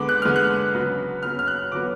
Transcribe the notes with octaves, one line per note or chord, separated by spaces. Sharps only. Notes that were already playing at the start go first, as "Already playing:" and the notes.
Already playing: D3 G#3 B3 D6
F#6
D3 G#3 B3 F6
F#6
C#3 F#3 B3
C#3 F#3 B3 F6
F6
F#6
D3 F#3 B3 D6